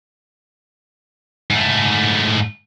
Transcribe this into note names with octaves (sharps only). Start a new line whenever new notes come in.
G#2 A3